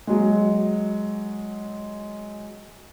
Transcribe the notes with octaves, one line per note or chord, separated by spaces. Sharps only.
F#3 G#3